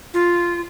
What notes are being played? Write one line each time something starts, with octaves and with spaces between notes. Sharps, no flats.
F4